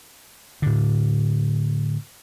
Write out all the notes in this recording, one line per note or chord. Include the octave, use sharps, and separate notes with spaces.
A2 D3